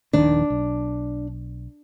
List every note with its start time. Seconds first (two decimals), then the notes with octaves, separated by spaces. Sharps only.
0.13 D#1 A#1 D#3 D4
0.50 B1